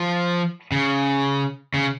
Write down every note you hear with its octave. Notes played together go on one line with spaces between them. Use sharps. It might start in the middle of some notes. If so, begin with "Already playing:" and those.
Already playing: F3
C#3
C#3